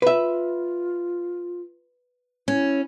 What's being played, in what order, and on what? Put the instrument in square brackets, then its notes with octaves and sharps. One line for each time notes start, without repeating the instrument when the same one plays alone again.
[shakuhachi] F4 [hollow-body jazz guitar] B4 E5
[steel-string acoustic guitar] C#4 [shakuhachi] E4